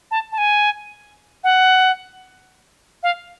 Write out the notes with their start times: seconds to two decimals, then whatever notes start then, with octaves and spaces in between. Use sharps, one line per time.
0.11 A5
0.32 A5
0.38 G#5
1.44 F#5
3.03 F5